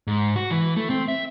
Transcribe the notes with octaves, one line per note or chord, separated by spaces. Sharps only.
G#2
F#4
E3
A3
C4
E5